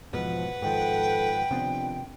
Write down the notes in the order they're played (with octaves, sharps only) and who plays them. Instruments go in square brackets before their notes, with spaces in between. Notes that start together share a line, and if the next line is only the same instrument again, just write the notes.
[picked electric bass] E2 G#2 B2 [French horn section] F3 [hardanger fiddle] B4 F#5
[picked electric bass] G#2 D#3 F3 [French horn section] A4 [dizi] G5
[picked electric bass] C3 B3 C4 [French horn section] D#3 F3 D4